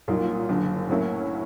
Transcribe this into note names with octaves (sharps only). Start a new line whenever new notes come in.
C2 A#2 F#3 A#3 D#4
F#1 F#2 D3
A2 F#3 A#3 C#4 E4